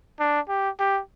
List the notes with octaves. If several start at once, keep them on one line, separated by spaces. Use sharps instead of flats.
D4
G4
G4